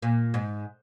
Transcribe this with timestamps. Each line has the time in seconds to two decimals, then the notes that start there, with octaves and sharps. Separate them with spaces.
0.02 A#2
0.34 G#2